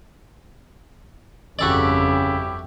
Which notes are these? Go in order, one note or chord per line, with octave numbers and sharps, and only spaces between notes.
G1 F2 C#3 E4 F#4 G4 A4 D5